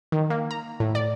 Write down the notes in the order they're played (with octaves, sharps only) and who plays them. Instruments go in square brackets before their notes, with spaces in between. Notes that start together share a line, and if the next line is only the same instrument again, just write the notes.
[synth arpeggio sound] D#3
A#3
A#5
A2
D5